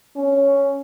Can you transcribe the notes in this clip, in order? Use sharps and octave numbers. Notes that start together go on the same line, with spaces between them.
C#4